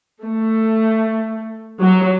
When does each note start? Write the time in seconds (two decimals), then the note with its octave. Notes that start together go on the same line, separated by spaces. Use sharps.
0.25 A3
1.82 F#3